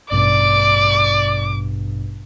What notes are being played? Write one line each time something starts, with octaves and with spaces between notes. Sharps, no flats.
A1 G2 B2 D5 D6